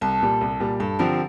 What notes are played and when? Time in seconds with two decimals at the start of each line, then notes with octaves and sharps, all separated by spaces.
0.01 C2 A4
0.22 A#2 G3
0.41 C2
0.60 A#2 G3
0.80 G2 A4
0.99 D3 F3 C4 G4 A#4